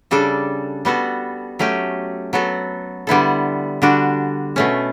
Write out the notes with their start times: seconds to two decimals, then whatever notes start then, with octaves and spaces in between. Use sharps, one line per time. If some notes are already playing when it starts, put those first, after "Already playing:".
0.11 C#3 G3 D4 A4
0.85 G3 B3 F#4 A4
1.59 F#3 A3 C#4 G4
2.33 F#3 B3 F#4 A4
3.07 D3 G3 B3 E4 A4
3.82 D3 G3 D4 F#4
4.56 B2 A3 C#4